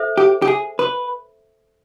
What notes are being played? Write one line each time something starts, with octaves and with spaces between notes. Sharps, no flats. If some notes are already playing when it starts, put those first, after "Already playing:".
Already playing: A4 C5 E5
G4
G4
G#4
B4